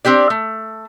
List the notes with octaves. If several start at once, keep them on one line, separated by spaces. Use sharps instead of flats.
C4 D4 G4 D5
A3